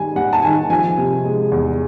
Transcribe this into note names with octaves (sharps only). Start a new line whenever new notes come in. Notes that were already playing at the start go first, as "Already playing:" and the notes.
Already playing: D#3 G3 G#5
G3 F#5
A5
D#3 G#5
F3 G#5
C3
G#3
E2